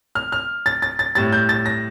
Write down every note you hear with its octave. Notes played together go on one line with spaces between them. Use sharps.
F6
F6
A6
A6
A6
A2 G3 A6
G6
A6
A#6